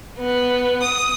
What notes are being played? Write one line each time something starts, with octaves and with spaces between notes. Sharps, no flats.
B3
D#6